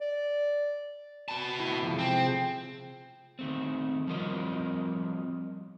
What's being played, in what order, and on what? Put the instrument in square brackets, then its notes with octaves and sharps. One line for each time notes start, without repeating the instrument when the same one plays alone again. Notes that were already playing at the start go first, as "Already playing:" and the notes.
[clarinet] D5
[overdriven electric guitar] B2 A5
[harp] A3 E4
C3 F3 G#3
[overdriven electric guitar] C4
[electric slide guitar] D#3 A3 C4
F3 G3 C4 F4 A#4 D#5